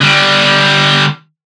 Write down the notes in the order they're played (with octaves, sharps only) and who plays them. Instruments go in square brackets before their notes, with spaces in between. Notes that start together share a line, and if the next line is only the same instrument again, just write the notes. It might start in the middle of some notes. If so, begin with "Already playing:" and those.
[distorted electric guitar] D3 G3